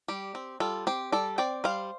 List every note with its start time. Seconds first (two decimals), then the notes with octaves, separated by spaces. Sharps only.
0.08 G3 G4
0.35 C4
0.60 G3 F4 A4
0.87 C4 G4 C5
1.12 G3 A4 D5
1.38 C4 D5 G5
1.64 G3 C5 F5